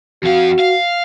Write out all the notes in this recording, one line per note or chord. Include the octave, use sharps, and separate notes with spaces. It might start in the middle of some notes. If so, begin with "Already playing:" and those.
F2 F#4 F5
F5